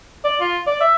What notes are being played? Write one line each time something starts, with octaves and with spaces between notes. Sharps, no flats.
D5
F4
D5
E5